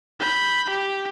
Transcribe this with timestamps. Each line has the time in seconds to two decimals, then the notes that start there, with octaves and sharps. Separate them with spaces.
0.20 B5 G6
0.70 G4